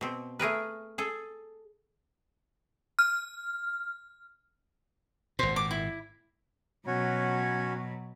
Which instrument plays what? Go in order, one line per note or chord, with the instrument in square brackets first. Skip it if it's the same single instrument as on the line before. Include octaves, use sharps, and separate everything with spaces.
[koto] B2 C4
A3 G#4 A#4 B4
G#4 A4
[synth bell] F6
[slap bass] G#1 A#2 [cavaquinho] C5
[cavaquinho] D6
E4
[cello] B2 F#3 [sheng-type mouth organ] C#4 F#4 C#5